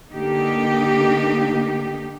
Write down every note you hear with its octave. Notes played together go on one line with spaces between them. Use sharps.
D3 A#3 D#4 G4